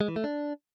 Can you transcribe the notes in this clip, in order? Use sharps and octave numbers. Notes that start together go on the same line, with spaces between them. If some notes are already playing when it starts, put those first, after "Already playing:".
G#3
E3
A3
D4